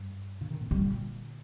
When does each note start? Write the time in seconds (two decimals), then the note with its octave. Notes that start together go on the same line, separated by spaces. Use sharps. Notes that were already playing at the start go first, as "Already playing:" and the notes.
Already playing: G2
0.41 A#2 D3
0.50 C3 D#3
0.61 A2 C3
0.71 A#2 D3 G3
0.86 A#2 D3